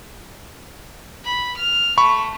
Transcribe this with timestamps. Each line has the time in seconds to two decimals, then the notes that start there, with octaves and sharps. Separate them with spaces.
1.24 B5
1.56 F6
1.98 A3 B5 C#6